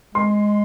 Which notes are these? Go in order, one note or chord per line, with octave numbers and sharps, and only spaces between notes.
G#3 C6